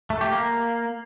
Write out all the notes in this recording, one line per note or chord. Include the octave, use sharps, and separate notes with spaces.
A3
G4
A#3